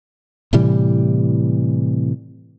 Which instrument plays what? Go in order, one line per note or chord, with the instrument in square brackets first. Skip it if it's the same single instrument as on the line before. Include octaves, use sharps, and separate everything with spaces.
[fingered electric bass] A2 C3 E3 G3